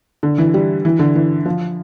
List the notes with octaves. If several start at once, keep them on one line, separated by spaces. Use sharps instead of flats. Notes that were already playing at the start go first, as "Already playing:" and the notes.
D3
E3
G3
E3
D3
E3
F3